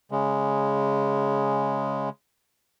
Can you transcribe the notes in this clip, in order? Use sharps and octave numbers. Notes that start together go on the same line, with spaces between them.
C#3 G#3